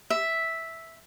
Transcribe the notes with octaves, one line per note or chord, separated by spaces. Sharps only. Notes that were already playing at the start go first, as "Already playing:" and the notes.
E5